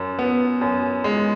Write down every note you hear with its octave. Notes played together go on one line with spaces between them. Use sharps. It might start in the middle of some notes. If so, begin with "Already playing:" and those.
Already playing: F#2
B3
F#2
G#3